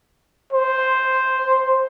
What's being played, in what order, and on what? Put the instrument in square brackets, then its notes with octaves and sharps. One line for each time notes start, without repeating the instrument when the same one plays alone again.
[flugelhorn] C5